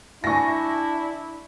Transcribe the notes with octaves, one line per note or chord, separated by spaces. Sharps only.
D4 E4 A4 G#5 C#6 G6 A#6